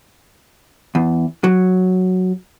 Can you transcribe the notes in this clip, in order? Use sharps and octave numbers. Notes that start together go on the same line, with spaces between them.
E2
F#3